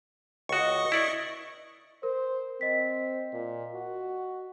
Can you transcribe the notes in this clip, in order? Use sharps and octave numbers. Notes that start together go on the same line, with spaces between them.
C#2 F#4 D#5 C#6
E4 D5
A#4 C5
C4 D#5 B6
A#2
F#4